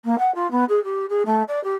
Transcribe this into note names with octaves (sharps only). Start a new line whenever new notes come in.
A#3
F#5
F4
B3
G#4
G4
G#4
A3
D5
G4